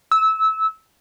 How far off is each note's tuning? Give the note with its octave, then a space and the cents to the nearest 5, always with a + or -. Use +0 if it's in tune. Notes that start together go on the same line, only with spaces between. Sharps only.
E6 -20